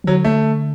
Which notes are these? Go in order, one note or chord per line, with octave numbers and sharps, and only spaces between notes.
E3
D3 F#3
A3